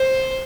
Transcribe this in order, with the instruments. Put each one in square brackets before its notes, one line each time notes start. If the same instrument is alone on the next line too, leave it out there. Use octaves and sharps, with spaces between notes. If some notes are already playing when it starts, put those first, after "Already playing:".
Already playing: [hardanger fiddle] C5